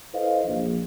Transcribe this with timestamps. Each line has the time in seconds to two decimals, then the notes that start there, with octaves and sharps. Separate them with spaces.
0.14 E4 A4 B4 C5 D#5 F5
0.45 A#1